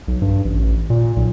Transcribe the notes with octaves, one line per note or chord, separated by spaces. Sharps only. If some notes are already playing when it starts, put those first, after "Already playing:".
B1
G2
A1
A#2
B1